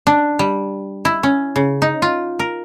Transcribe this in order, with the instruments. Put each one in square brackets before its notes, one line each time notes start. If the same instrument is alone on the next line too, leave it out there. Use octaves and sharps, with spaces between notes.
[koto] D4
G3
E4
C#4
C#3
D#4
F4
A#4